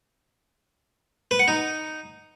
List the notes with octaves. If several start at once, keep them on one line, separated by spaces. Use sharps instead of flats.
B4
F#5
D#4